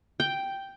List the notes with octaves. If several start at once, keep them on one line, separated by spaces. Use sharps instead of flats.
G5